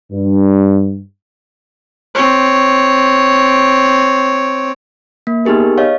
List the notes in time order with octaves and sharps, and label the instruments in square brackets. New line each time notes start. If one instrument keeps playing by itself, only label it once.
[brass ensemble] G2
[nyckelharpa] C4 C#5
[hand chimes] A#3
B3 D#4 G4 G#4 A#4
C#5 D#5 F5